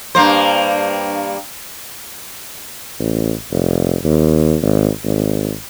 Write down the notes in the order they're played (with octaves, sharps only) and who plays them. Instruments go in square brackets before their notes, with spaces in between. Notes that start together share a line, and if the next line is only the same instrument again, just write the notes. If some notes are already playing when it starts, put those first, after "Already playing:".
[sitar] G2 A#3 C5
[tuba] A1
F1
D#2
G#1
G#1